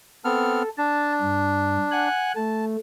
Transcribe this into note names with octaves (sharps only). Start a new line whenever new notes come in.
B3 C4 A4 F6
D4 A5
G2
F#5 G#5 F#6
A3 A5